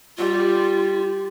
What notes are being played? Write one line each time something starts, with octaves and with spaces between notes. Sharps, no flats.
G3 F4